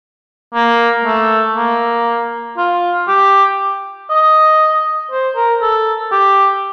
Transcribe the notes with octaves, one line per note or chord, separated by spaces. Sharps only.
A#3
A3
A#3
F4
G4
D#5
C5
A#4
A4
G4